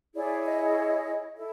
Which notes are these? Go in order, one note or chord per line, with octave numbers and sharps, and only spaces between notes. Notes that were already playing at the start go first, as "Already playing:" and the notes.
E4 G#4 C#5 D5
D#5
E4 A4